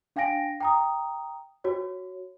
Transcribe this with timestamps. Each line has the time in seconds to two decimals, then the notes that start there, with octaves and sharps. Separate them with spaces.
0.16 D4 F5 G5 G#5 A#6 D7
0.61 G5 A#5 D#6
1.64 F#4 C#5